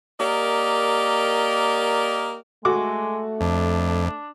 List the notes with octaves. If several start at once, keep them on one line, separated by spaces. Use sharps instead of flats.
A#3 G4 A#4 D5 D#5
G#3 A3 F#4 A4 D6
F2 D4